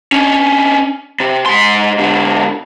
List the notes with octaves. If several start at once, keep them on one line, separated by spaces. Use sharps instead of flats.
C#4 D4
C3
G#2 C6
G#2 D3